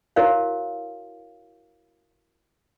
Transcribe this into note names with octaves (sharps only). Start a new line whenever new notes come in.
E4 F#4 A#4 C#5 F5